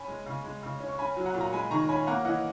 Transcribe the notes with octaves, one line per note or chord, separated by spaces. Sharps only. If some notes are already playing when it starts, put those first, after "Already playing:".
Already playing: C#4 G#5 B5
G#3
C#3
G#3
C#3
C#4
C#6
C#4 G#5 B5
F#3
F#5 A#5
A#2
A#5
G#3 G#5 B5
D#3 A#5 C#6
C#4 G#5 B5
A#3 F#5 A#5
E3 D#5 F#5